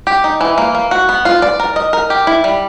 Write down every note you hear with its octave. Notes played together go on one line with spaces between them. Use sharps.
G4
D#4
E3
A#3
A#3
F#4
B3
F4
D5
A#4
D#5
A#4
G4
E4
G3